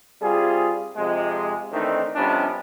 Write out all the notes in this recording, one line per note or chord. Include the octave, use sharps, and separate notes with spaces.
C3 G3 F4 G#4
F2 C3 F3 G#3
D#3 E3 A3 C4 D4 D#4
F2 C3 G3 B3 C#4 D4